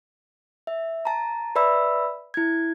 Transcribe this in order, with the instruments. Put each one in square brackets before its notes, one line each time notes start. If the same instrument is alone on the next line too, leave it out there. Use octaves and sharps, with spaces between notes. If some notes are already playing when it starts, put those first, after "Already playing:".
[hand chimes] E5
A5 A#5
B4 D5 E5 B5 E6
E4 G#6